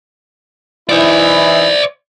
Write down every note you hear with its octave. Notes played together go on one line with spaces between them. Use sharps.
E3 D#4 E4 C5 D5